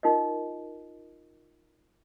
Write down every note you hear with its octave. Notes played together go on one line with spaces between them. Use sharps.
D#4 F4 A#4 D#5